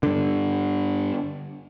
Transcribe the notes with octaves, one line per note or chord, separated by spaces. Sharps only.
G2 D3